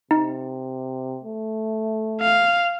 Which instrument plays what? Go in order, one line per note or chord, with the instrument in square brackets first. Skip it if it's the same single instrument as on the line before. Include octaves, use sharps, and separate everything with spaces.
[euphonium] C3 [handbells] D#4
[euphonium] A3
[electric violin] F5